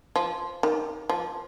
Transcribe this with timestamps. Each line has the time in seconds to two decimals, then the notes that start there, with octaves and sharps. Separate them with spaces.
0.16 F3
0.63 D#3
1.09 F3